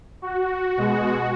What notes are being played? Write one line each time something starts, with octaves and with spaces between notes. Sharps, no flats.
F#4
B2 G#3